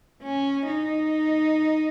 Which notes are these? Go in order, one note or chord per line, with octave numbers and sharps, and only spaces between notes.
C#4
D#4